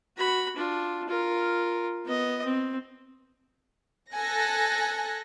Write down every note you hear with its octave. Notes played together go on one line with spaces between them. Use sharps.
F#4 B5
D4 F4
F4 A#4
B3 D#5
C4
A4 G#5 F#6 A#6